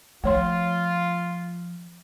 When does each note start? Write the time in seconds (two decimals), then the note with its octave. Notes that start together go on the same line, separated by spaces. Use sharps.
0.24 F3 A3 F4 C#5 C6